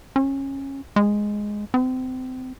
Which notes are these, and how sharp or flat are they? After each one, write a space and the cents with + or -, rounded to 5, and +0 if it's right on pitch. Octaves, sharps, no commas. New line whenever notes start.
C#4 -20
G#3 +0
C4 -30